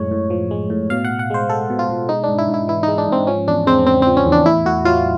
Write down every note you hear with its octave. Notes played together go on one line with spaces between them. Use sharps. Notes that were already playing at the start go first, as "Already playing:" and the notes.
Already playing: F#2 A2 G#3 C#5
A2
F3
G#3
A2
B2 F5
F#5
B2
F#5
G#3 C5
G#3 A4
B2
F4
B2
G#3 D#4
D4
G#2
E4
G#2
E4
E3 E4
G#3 D#4
D4
G#2 C4
F3 C#4
E2 D4
G#3 C4
C#3 C4
F3 C4
C#4
E2
D4
A2 E4
A2 F#4
F#3 F4